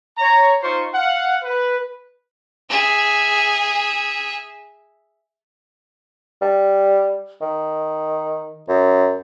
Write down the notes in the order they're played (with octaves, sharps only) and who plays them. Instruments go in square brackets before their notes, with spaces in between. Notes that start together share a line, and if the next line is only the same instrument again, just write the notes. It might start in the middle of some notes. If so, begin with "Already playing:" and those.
[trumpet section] C#5 A#5
D#4 F4 C5 C6 C#6
F5 F#5
B4
[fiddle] G#4 E5
[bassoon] G3
D#3
F#2